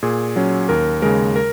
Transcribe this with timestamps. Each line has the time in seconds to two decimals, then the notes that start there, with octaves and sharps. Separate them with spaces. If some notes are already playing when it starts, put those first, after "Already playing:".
0.03 A#2 G#4
0.36 F#3 C#4
0.69 D#2 A#4
1.02 C#3 G#3 A#4
1.36 A#4